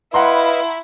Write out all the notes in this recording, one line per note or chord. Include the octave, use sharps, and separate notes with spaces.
E4 B4 D#5 F5 F#5 A#5 C6